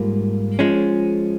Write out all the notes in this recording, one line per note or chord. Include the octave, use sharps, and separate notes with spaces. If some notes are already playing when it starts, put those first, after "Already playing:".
Already playing: G#2 G3 A#3 F4
F3 G#3 C#4